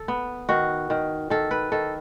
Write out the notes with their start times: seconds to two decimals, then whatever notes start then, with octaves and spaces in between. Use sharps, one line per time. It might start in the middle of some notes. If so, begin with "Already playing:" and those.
Already playing: A4
0.08 B3
0.49 D#3 F#4
0.90 D#3
1.30 D#3 A4
1.51 B4
1.72 D#3 A4